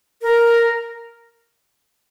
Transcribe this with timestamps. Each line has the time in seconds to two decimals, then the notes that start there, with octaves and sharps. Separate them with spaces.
0.22 A#4